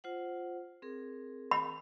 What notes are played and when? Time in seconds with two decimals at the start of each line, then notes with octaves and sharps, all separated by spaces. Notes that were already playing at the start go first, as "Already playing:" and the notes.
0.04 F4 C5 F#5
0.82 C4 G#4 A#4
1.51 B5